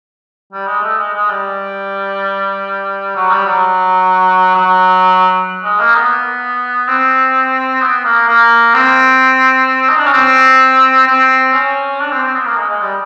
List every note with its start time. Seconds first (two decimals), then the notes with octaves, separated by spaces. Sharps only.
0.53 G3
0.67 G#3
0.83 A3
0.98 G#3
1.14 G#3
1.29 G3
3.16 F#3
3.31 G3
3.46 F#3
4.55 F#3
5.64 G#3
5.80 A#3
5.95 B3
6.88 C4
7.81 B3
8.05 A#3
8.28 A#3
8.74 C4
9.89 D#4
9.98 D4
10.06 C#4
10.13 C4
11.07 C4
11.53 C#4
12.00 D4
12.12 C4
12.23 C4
12.35 B3
12.46 A#3
12.57 G#3
12.69 G#3
12.82 G3